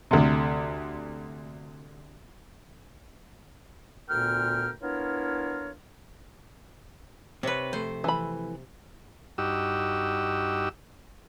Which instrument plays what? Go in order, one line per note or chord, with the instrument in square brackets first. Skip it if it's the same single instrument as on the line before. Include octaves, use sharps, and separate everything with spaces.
[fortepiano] D2 C3
[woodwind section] D2 A#2 B3 A#4 G5 F6
B3 D4 E4 F4 A#4 C#5
[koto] C3 B4 [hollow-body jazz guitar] C4 C#5
[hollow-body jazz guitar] F2 A3 [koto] C5
[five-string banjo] E3 B5
[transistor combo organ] G2 D#4 F#4 G4 E6